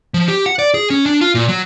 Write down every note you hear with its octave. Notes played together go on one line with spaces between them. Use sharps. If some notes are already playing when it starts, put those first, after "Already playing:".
F3
G4
F#5
D5
G#4
C#4
D4
F4
A#2
F#3